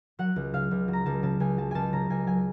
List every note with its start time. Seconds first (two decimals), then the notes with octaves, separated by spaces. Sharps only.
0.19 F#3 F#5
0.36 C#2
0.54 C#3 F5
0.71 C#2
0.88 F#3
0.93 A#5
1.06 C#2 A5
1.23 C#3 A5
1.40 C#2 G#5
1.57 F#3 A5
1.71 C#2 G#5 A5
1.93 C#3 A#5
2.10 C#2 G#5
2.27 F#3 G#5